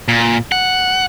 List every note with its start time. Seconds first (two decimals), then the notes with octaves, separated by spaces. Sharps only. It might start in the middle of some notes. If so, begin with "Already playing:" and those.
0.08 A#2
0.52 F#5